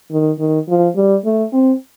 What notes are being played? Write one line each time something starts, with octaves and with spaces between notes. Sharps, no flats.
D#3
D#3
F3
G3
A3
C4